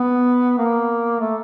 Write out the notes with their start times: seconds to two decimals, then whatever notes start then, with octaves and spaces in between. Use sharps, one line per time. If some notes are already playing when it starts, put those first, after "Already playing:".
Already playing: B3
0.58 A#3
1.20 A3